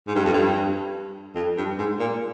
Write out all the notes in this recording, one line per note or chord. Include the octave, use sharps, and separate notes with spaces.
G#2
G2
F2
G2
F2
G2
G#2
A#2